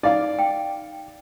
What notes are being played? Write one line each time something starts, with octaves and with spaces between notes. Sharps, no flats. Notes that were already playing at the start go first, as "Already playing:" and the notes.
D#4 D5 F5 D6
G5